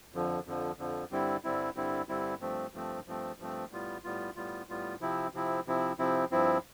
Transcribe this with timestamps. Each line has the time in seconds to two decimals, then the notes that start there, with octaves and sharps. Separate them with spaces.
0.14 F2 D3 F3
0.46 F2 D3 F3
0.79 F2 D3 F3
1.11 G2 D3 G3 C4 E4
1.44 G2 D3 G3 C4 E4
1.76 G2 D3 G3 C4 E4
2.09 G2 D3 G3 C4 E4
2.41 G2 F3 A3 C4
2.74 G2 F3 A3 C4
3.06 G2 F3 A3 C4
3.39 G2 F3 A3 C4
3.71 A2 G3 B3 F4
4.04 A2 G3 B3 F4
4.36 A2 G3 B3 F4
4.69 A2 G3 B3 F4
5.01 C3 F3 C4 E4
5.34 C3 F3 C4 E4
5.66 C3 F3 C4 E4
5.99 C3 F3 C4 E4
6.31 G2 F3 C4 E4